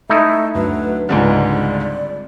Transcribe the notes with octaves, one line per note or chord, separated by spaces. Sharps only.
A3 D#4 E4 E5
D2 F#3 B4
C#2 G#2 D3 G3 C4 F4 D5